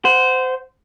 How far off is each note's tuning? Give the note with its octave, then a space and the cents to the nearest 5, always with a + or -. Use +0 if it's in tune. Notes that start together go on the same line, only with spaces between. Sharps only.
C5 -20 F#5 +0